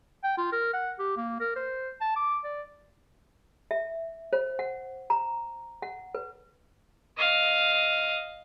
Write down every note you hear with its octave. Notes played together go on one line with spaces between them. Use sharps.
G5
F4
A#4
F#5
G4
A#3
A#4
C5
A5
D6
D5
E5
C5
F#5
A#5
F#5
B4
D#5 F5